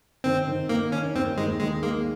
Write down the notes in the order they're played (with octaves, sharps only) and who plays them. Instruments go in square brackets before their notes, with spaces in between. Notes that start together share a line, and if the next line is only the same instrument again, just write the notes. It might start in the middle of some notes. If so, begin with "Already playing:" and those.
[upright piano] D#3 [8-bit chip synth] C4
[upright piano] D#3
[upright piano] D#3 [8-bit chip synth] A#3
[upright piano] D#3 [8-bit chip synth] C#4
[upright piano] D#2 [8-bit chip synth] C4
[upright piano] D#2 [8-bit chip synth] G#3
[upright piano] D#3 [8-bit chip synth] G#3
[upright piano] G#3 [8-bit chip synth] A#3